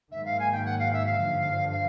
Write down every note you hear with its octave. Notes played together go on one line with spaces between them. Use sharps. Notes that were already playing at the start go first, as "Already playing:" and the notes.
G#2 D#3 F#3 A#3 E5
F5
G#5
G5
F#5
F5
E5
F5
G2 D3 F3
F5